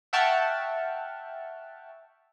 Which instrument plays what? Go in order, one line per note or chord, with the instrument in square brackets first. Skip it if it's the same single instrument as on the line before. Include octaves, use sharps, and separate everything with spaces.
[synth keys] E5 F#5 G5 A5 C#6 F6